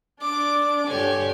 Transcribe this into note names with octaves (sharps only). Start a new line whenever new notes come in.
D4 D6
G2 D3 G4 C#5 G#5